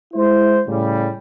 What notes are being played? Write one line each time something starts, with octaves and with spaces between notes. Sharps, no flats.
G#3 E4 C5
A2 C#3 G3